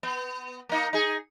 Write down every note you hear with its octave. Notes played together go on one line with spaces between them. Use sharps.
B3
A#3 D#4
D#4 G#4